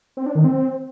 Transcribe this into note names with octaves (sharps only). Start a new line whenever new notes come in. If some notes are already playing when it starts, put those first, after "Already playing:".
C4
D4
D#3
C4